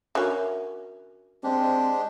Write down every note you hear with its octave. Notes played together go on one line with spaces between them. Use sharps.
D3 C#4 F#4 A#4 E5
G#3 C4 D4 G4